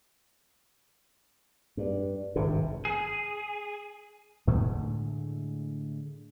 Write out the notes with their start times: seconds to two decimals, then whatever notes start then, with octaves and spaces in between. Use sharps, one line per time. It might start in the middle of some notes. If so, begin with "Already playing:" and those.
1.77 G2
2.36 G#1 G2 C3
2.85 G#4
4.47 A2 D3 G#3 A3